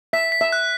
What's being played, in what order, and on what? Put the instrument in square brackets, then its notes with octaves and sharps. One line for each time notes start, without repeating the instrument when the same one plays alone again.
[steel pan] E5 [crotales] B6
[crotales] B6
[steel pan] E5
[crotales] F#6